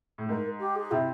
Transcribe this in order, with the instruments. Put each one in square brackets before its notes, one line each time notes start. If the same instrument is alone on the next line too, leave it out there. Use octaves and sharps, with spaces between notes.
[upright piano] A2
[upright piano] G#2 [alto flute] A#4
[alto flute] G4
G#4
[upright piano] C3 [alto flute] E4